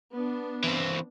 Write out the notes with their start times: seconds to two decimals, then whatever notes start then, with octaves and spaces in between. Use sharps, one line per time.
0.13 B3 D4
0.64 E3 C4